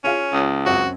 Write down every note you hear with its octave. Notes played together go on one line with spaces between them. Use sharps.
C#4 F4 G#4 F5
C#2
F#2 C4 C#4 F#4